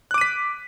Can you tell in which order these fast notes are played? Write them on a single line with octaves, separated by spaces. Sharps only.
F#6 D6 D#7 B6